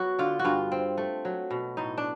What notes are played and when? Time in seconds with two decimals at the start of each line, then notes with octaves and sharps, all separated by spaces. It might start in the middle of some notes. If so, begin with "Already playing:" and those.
Already playing: F#3 B3 F#4
0.19 D3 F4
0.39 F#4
0.45 G2 F4
0.72 C4
0.98 A3
1.25 F#3
1.51 B2
1.77 A2 D#4
1.98 D4